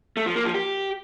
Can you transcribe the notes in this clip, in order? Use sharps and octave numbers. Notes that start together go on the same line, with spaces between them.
A3
F3
A#3
F3
G4